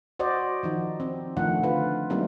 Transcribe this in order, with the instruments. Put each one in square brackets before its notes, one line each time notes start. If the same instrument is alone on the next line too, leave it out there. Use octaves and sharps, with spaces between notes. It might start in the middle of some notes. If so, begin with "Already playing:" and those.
[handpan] F#4 C5 D5 D#5
D#3 F3 D#4
C4
D#3 F3 A3 D4 F#5
D3 F4 B4
F#3 G3 A3 A#3 C4 D#4